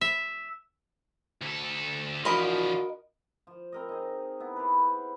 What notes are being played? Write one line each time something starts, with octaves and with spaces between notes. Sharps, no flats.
E5
D2 A4
E3 F3 D4 F4 F#4 A#4 D#5 B5
F3
C4 A#4 D#5
D#4 G#4
B3 E4
G4 G#4 B4
B4 C5